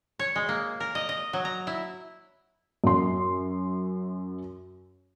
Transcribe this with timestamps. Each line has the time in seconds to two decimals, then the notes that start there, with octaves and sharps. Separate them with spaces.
0.19 C#5
0.36 G#3
0.49 A#3
0.80 A#4
0.95 D#5
1.09 D#5
1.33 F#3
1.45 A#5
1.67 E4
2.84 F#2 C6